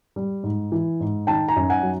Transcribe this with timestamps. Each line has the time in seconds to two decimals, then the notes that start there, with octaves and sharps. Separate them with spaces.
0.16 G3
0.43 G#2
0.72 E3
1.00 G#2
1.27 D#3 G5 A5
1.48 G#5 A#5
1.56 F#2
1.70 F#5 G#5
1.83 F#3